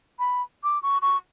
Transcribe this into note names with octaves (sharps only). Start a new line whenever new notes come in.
B5
D6
C#6
C#6